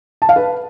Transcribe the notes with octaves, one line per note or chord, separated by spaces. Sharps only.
A5
F5
B4